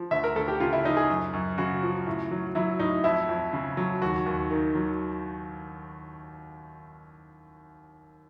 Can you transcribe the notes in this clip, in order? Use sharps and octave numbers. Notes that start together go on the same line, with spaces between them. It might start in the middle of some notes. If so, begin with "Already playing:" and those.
Already playing: F3
D2 E5
A#4
D2 A4
G4
C#3 F4
E4
F3 D#4
G#4
F#2
F#2
C#3 F#4
F3
A2
F#3
F#3 E4
A2 D#4
F2 E4
F2
C#3
F#3
D#2 F#4
D#2
D#3
F#3